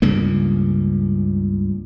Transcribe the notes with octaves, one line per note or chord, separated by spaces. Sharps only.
C#2 G2 C#3 A#3